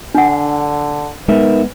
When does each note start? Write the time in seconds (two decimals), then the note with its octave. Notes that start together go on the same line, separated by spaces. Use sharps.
0.15 D3 D4 F#5
1.28 G#3 B3 D#4 A#4 B4 E5